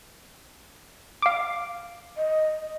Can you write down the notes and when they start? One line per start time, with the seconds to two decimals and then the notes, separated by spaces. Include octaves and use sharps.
1.22 F5 D6
2.17 D#5